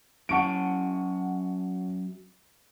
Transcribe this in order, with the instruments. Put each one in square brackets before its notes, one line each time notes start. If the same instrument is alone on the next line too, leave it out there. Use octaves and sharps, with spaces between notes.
[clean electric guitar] F#2 C#4 A5 [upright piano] F#5 C#6 D7